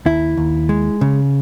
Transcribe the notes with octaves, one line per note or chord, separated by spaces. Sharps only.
D#2 E4
D#2
G#3
C#3